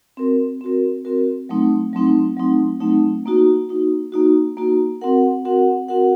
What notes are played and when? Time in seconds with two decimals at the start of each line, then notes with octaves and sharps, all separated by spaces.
0.17 C4 F#4 A#4
0.61 C4 F#4 A#4
1.05 C4 F#4 A#4
1.49 F#3 A3 C4 D#4
1.93 F#3 A3 C4 D#4
2.37 F#3 A3 C4 D#4
2.81 F#3 A3 C4 D#4
3.26 A#3 D#4 F#4
3.69 A#3 D#4 F#4
4.12 A#3 D#4 F#4
4.57 A#3 D#4 F#4
5.01 C4 F#4 A#4 F#5
5.45 C4 F#4 A#4 F#5
5.88 C4 F#4 A#4 F#5